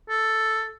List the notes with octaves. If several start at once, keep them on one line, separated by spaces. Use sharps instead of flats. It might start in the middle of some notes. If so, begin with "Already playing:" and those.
A4